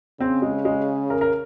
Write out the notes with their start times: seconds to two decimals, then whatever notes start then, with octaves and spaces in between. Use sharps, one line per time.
0.20 C#3 C4
0.42 G#3
0.65 G#3
1.10 A#4
1.21 A#4